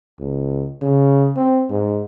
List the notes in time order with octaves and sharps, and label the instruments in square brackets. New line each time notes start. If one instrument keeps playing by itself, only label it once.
[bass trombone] C#2
C#3
C4
G#2